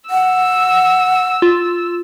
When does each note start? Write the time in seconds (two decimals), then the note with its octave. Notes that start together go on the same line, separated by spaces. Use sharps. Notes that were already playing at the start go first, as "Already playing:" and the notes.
0.10 F#5 E6
1.42 F4